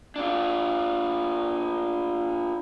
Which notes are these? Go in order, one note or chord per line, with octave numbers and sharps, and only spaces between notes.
D4 F4